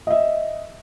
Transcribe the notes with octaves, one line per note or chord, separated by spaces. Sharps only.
D#5 E5